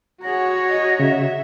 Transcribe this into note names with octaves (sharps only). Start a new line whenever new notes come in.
F#4 G#4 C#5 F#5 A#5
D#5 F#5
C#3 E5 F#5